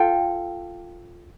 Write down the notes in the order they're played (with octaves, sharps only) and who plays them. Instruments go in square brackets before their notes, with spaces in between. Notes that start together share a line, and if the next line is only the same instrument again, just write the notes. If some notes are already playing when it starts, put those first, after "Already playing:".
Already playing: [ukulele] F4 A4 G5